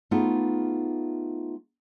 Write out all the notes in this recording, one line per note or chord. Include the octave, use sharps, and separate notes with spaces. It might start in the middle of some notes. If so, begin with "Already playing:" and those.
A3 B3 D#4 F4 G#4